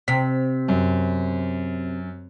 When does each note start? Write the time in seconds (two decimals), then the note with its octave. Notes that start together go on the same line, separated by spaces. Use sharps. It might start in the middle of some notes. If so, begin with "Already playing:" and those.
0.08 C3 B6
0.68 F#2